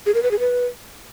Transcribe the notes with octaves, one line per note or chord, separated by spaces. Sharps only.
G#4
A#4
B4
G#4
B4